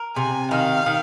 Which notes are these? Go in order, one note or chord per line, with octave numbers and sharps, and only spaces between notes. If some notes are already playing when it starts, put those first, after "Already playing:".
Already playing: A#4
C3 G#5
D#3 F5
D#3